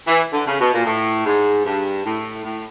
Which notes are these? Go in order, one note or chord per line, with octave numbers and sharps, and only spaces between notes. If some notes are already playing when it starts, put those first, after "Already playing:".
E3
D3
C#3
B2
A#2
A2
G#2
G2
A2
A2